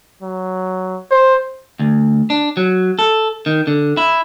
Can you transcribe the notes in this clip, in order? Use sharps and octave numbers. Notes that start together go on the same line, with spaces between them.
F#3
C5
D2
D4
F#3
A4
D#3
D3
E4